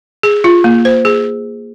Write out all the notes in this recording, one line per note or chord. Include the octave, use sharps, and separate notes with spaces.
G#4
F4
A#3
C5
G#4